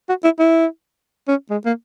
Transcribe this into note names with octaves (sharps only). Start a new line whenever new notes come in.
F#4
E4
E4
C#4
G#3
A#3